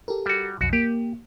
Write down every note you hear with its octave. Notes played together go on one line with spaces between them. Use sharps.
G4 A4 A#4
G3 F#4
B1 F2 F#4
A#3 G4